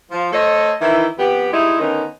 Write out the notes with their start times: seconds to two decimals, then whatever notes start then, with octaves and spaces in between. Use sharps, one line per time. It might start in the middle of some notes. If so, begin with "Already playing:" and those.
0.11 F3
0.32 A3 A4 C5 C#5 D#5
0.80 D#3 E3 E4
1.18 F2 B3 G4
1.52 G3 G#3 D#4 E4
1.79 D3 D#3 B3 C#4 D#4